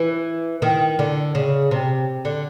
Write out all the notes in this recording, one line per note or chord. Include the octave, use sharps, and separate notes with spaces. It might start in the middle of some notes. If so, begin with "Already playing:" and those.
Already playing: E3
D#3
D3
C#3
C3
D3